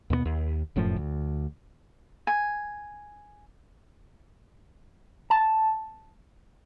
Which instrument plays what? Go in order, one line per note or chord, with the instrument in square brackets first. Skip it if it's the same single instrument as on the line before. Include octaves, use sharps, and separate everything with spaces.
[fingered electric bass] D#2 B2 G#3 B3
D#2
F1 F#2 A2 F3
D2
[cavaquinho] G#5
[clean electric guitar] A5